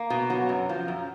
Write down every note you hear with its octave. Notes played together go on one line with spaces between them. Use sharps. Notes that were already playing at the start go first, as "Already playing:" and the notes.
Already playing: A#3
B2
F#3
F#2
F3
F#2